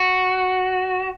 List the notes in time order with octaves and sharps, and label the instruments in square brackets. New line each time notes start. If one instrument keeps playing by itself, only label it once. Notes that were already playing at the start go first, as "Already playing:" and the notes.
Already playing: [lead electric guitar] F#4